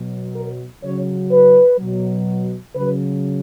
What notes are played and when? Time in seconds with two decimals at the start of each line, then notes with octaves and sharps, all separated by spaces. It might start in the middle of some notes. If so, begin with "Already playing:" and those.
Already playing: B2 F#3
0.36 A#4
0.83 C#3 F#3 C#5
1.31 B4
1.79 B2 F#3
2.75 C#3 F#3 B4